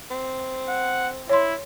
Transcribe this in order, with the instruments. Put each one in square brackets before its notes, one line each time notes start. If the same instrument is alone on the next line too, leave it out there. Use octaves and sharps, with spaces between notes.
[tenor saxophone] C4
[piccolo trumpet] F#5
[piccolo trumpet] E4 [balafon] C#5 C6